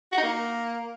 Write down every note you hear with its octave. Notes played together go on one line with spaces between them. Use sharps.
F#4
D#4
A#3